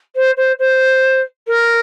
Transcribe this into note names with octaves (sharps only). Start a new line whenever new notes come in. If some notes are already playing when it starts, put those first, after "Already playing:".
C5
C5
C5
A#4